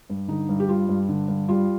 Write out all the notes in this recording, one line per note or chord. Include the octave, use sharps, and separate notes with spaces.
G2
D3 D#4
G2
G4
G3 F4
G2
D3
G2
G3 F4